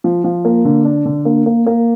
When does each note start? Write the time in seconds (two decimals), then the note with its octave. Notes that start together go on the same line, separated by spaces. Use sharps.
0.04 F3
0.24 F3
0.45 A#3
0.65 D3
0.85 D4
1.05 D3
1.25 A#3
1.46 A#3
1.66 A#3